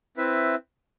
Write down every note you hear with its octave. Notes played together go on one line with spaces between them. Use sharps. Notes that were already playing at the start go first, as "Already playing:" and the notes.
C4 E4 B4 E5